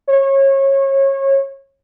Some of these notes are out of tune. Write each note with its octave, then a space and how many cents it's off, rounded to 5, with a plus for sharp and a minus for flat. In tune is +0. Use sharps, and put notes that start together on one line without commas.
C#5 -25